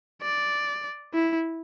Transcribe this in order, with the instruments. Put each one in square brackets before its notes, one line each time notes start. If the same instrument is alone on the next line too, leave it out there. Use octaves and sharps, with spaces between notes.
[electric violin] D5
E4